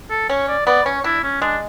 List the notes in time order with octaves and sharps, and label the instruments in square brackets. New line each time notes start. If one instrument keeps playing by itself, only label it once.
[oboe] A4
[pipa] C#4 [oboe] C#5
[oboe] D5
[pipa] B3 [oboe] D5
[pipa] C#4 [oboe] C#5
[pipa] D4 [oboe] E4
[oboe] C#4
[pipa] G#3 [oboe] D4